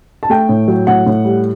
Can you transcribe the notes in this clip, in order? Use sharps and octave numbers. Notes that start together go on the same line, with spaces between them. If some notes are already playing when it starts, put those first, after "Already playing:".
A5
A3 G5
A2
F#3
A2 F#5
A2
G3